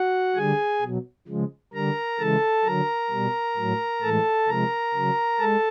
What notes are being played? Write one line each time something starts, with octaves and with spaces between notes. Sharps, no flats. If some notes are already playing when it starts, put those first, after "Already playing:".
Already playing: F#4 F#5
D3 G3 G#4 G#5
B2 F#3
C#3 F3 G#3
D3 G3 A#4 A#5
C#3 E3 G#3 A4 A5
D3 F#3 A#4 A#5
B2 G3
A2 F#3
A2 E3 G#3 A4 A5
C3 F3 G#3 A#4 A#5
C#3 F#3
G#3 A4 A5